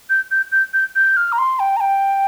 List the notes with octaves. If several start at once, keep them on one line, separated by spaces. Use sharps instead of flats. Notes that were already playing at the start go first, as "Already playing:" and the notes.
G6
G6
G6
G6
G6
F6
A#5
C6
G5
A#5
G5